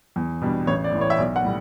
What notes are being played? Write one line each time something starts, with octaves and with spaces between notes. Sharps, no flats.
E2
B2 G3 D4
A1 C#5
D5
A2 E3
C#5
E5
B1 D5
F#5
A2 G3